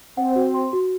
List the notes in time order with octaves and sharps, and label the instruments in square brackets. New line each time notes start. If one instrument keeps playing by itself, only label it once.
[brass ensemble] C4 [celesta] F#5
[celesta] F#4
C6
F#4